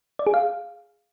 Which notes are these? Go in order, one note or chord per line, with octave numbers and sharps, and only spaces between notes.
D5
G#4
F5